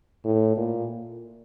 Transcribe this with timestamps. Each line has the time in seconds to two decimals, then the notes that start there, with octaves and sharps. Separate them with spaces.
0.25 A2
0.57 A#2